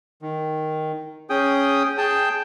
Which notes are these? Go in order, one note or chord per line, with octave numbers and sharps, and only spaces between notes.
D#3
C#4 G#4 G5 D#6
G#4 G5 A5